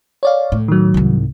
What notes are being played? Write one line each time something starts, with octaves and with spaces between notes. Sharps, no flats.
C#5 D5 F5
A2
D#3 F#3
C2 G#2